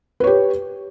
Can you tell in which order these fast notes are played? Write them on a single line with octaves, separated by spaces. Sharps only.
B4 C#5 G4